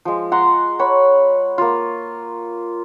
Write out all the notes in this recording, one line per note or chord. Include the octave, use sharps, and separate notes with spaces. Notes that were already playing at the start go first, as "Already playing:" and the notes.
F3 G#3
F#5 A#5 C6
C#5 F#5 B5
A#3 F4